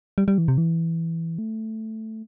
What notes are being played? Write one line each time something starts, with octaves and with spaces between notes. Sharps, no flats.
G3
G3
E3
C3
E3
A3